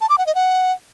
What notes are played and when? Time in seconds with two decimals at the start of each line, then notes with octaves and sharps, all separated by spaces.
0.01 A5
0.10 D6
0.18 F#5
0.27 D#5
0.35 F#5